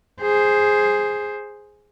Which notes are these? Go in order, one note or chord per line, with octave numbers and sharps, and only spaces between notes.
G#4 C5